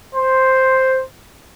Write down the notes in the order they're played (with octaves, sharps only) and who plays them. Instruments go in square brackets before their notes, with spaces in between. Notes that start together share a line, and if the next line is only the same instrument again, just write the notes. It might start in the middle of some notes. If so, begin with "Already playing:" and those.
[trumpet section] C5